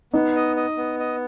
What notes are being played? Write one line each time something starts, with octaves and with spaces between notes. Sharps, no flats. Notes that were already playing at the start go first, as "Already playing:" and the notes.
B3 D#4
D#5
D#5
B3
D#5